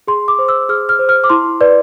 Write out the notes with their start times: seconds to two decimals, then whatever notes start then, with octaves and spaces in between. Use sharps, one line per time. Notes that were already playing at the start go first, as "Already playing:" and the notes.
0.07 G#4 C6
0.28 D6
0.39 C5
0.49 E6
0.69 G#4 F6
0.89 F6
0.99 C5
1.09 F6
1.24 D6
1.30 E4 C6
1.61 B4 D5